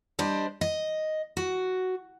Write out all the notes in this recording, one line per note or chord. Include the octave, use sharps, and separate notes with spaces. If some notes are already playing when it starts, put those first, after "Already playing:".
G3 D4 C5 D#5
D#5
F#4